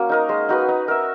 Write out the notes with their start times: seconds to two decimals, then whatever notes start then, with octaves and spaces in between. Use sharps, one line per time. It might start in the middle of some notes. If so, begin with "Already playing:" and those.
Already playing: A#3 C#4 F#4
0.09 D#4 A#4 D#5
0.29 G#3
0.49 D#4 F#4 B4
0.68 D#4
0.88 A#4 E5